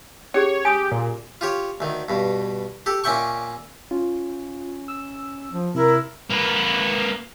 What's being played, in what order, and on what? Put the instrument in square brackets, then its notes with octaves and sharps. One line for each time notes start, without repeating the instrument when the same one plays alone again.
[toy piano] C#4 G4 G#4 [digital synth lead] C#5
[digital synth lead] G4 [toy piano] G#5 D#6
[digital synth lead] A#2
[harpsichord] F4 G4 C#5
D2 D#3
G2 B2
G4 A4
A#2 C#4 D5 E5 G5 C#6
[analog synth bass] C#4 [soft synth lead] F4
[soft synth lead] E6
[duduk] F3
[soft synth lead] C3 [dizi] E4 [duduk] A#4
[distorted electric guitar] A#3 B4